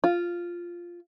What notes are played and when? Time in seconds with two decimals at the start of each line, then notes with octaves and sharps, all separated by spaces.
0.04 F4